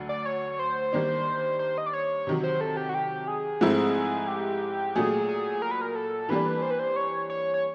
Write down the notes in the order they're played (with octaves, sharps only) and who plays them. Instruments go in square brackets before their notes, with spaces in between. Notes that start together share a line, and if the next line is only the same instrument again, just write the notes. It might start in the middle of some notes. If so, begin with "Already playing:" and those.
Already playing: [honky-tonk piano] D2 D3 F#3
[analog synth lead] D5
C#5
C5
[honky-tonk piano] D#3 G3 A#3 D4
[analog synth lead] C5
D#5
D5
C#5
[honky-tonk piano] C3 D#3 F#3
[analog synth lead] C5
A4
G4
F#4
G4
G#4
[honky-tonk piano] G#2 F3 A3 C4 E4
[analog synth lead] G4
[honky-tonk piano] A#2 F#3 A3 [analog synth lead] G#4
[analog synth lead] G#4
A#4
B4
A#4
A4
[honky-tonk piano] E3 G3 A#3 D4 G4 [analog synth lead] B4
[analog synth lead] C5
B4
C5
C#5
C#5
C#5